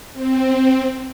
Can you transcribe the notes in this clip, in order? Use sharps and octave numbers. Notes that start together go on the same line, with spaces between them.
C4